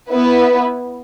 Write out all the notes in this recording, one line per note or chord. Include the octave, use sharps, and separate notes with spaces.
B3 E4 B4